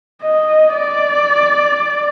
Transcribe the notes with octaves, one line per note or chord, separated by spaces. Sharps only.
D#5
D5